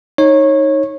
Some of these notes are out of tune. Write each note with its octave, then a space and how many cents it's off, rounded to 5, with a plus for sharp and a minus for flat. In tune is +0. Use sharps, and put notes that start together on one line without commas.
D#4 +0 C#5 -20